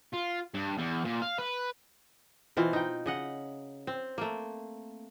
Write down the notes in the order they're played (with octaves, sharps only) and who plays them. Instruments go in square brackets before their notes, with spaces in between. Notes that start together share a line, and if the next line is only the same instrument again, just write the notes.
[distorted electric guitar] F4
G2
E2
A#2
F5
B4
[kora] B2 E3 C4 F4
D#4 G5
C#3 D#5 F#5
C4
A3 A#3